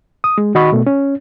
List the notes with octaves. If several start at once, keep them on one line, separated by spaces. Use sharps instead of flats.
D#6
G#3
D#3 F#4 D#5 B5 C#6
B2 A3
C#4